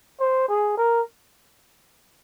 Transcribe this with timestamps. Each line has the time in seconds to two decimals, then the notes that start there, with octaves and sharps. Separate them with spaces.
0.20 C5
0.49 G#4
0.77 A#4